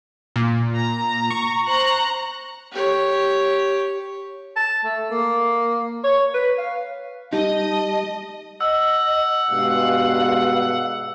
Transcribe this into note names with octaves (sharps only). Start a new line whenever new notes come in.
A#2
A#5
C#6
C5 A#5 F#6
G4 C#5
A5
A3
A#3
C#5
B4
F5
G3 D#4 D#5 A5
D#5 F#5 E6
G2 B2 G#3 F5